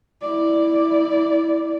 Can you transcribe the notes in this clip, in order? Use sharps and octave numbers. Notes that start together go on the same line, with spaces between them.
E4 D5